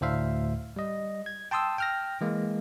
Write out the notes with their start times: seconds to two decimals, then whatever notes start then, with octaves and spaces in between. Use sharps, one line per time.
0.01 D2 A2 C5 E5 F5
0.76 G3 D#5
1.26 G#6
1.51 G5 A5 C6 D#6 E6
1.78 G5 F6 A#6
2.21 E3 G#3 A#3